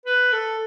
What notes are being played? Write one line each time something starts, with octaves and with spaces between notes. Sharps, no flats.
B4
A4